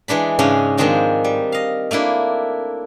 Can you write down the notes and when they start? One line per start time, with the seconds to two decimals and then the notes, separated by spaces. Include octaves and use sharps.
0.08 E3 G#3 D4 B5
0.39 G#2 C#3 G#3 C#4 D4
0.77 D#3 F3 G#3 C4 D4 D#4
1.24 G3
1.52 D#5 F5
1.91 A3 A#3 D4 E4